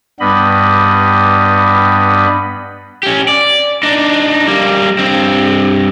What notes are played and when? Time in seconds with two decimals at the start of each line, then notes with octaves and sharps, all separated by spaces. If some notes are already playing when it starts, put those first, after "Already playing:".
0.20 G2 G3 B3 D#5 B5
3.03 C#4 G4
3.28 D5
3.83 D4 D#4
4.47 G3 A#3
4.99 G2 C4